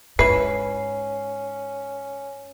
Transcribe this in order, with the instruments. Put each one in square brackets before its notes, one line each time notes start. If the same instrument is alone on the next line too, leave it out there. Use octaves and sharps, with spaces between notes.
[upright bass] G#2 [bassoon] C#4 [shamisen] E4 B4 [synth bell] C7